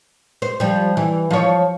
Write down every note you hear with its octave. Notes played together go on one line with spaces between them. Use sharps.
C5
F3 G3
E3
F3 C#5